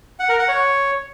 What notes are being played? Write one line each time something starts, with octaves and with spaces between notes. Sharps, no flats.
F#5
A#4
F#5
C#5